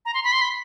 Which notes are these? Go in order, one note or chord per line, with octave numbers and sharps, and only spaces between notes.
A#5
C6
B5
C6
B5